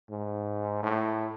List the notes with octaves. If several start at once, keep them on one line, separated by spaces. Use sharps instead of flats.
G#2
A2